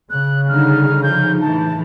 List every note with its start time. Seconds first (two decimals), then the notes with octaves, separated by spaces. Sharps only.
0.10 C#3 F#6
0.49 D3 G3 D#4 F6
1.03 F3 D#4 G6
1.41 A2 E3 A5